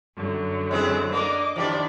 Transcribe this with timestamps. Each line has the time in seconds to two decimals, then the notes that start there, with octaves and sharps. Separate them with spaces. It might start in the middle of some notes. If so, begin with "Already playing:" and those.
0.16 F#2 D3 F#3
0.71 G#3 C4 E4
1.12 A#3 D4 D#5 D6
1.56 D#3 F3 D4 E4 G4 D5